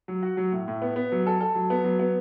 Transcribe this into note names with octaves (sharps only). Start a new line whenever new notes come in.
F#3
F#4
F#3
A2
A2
B3
B3
F#3
A4
A4
F#3
B3
F#3
B3